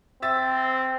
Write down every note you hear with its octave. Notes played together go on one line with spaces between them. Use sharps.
C4 E5 E6 A6